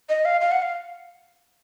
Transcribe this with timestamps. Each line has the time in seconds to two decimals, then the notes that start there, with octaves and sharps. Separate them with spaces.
0.09 D#5
0.25 F5
0.41 F5
0.52 F#5
0.62 F5